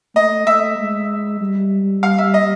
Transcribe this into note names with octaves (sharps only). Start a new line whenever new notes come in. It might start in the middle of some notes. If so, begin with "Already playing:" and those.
A3 D#5
A3 E5
G#3
G3
F5
E5
D#5